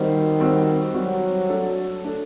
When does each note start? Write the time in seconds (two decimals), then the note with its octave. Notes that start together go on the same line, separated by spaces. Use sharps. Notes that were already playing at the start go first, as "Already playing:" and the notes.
Already playing: D#3 G3 C4 F#4 C5
0.39 G3 C4 F#4 C5
0.94 F#3 G3 C4 F#4 C5
1.49 A3 D4 A4
2.04 A3 D4 A4